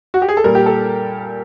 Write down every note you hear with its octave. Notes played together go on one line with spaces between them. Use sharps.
F#4
G4
G#4
A4
A#2 G3 A#4
G4
A4